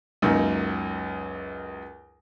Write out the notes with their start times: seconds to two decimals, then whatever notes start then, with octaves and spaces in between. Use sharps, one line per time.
0.22 C#2 F#2 A#3 D#4